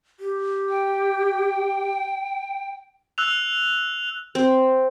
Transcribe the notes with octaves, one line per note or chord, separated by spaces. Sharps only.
G4
G5
E6 F#6 F7
C4